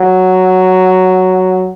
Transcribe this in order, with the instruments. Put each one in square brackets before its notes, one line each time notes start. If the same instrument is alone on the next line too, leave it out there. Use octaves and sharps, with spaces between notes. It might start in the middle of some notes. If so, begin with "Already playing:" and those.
Already playing: [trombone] F#3